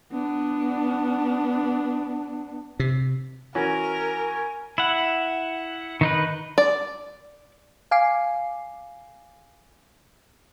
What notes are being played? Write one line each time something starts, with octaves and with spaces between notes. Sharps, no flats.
B3 D4
C3
E3 C#4 F#4 A#4 G#5
E4 F#5
D#3 D#4 B4
D5
F5 G#5 D6 C7